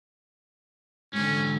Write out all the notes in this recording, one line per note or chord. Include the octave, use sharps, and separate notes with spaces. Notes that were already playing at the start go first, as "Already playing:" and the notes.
G#2 D3 C#4